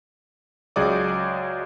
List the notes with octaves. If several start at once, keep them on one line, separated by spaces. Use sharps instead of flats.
C#2 F#3 G#4 D5 D#5 D6